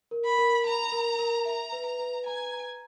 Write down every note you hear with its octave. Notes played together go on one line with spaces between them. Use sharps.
A#4
B5
A#4
A#5 B5
A#4
A#4
E5 A#5
B4
A#5
B4
G#5 A#5
A#5